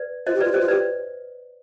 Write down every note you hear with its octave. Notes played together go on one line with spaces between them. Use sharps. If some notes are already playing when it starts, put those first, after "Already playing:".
Already playing: B4 D5
F4 C5 D#5
G4
F4 B4 D5
G4 C5 D#5
F4
G4 B4 D5